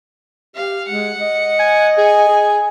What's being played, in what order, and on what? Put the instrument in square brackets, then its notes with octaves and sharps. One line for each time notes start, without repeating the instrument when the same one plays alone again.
[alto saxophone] G4 [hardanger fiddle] F5
[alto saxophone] G#3 [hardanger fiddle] F#5
[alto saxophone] D#5
[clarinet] G#5
[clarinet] G#4 [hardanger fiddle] G#5
[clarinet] G#4